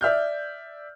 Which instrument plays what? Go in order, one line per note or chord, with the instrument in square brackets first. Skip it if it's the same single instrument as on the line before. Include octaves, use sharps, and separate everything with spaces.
[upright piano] D5 E5 F6 G6